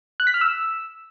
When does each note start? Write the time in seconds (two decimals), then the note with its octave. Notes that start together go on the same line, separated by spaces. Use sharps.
0.20 F#6
0.27 B6
0.34 F6
0.41 E6